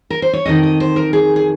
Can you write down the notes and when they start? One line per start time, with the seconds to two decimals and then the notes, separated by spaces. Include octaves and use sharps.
0.10 A#4
0.22 C5
0.33 C#5
0.46 F2 D#3 D#5
0.63 D#5
0.80 C5
0.96 A#4
1.13 G#4
1.36 G#4